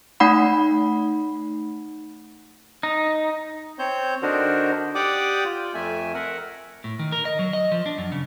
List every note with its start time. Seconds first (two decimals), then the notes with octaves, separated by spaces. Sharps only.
0.20 A3 D#4 F#5 B5
2.83 D#4
3.79 C4 C5 C#5 G6
4.22 D3 D4 D#4 F#4 A#4 C5
4.95 G4 D5 F#5 G5 D6 D#6
5.45 F4
5.74 F2 A3 E5 G#5
6.14 A#4 E5 F#5
6.84 A2
6.99 D#3
7.12 A#4
7.25 D#5
7.39 F#3
7.53 D#5
7.72 F3
7.86 D4
7.98 F#2
8.12 C#3